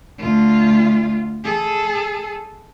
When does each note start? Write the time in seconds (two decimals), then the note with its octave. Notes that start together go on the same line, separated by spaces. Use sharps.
0.19 D2 F4
1.44 G#4 A4